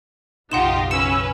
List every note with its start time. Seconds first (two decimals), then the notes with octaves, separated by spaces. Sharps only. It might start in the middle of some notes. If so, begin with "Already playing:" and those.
0.52 F#1 B1 D#4 F4 G4 F#5 C6 E7
0.91 C#4 B4 E6 C#7 E7